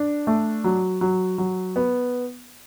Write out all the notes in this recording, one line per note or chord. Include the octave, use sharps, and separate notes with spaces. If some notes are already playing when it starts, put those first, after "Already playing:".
Already playing: D4
A3
F#3
F#3
F#3
B3